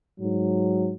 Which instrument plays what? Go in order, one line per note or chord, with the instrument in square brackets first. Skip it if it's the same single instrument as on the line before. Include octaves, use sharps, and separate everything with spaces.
[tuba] G#2 [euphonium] F#3